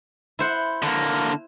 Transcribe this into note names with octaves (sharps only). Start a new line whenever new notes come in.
E4 C5 F#5
D3 A#3